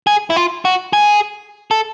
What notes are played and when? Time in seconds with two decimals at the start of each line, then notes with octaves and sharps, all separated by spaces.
0.07 G#4
0.30 E4
0.36 F4
0.65 F#4
0.93 G#4
1.71 A4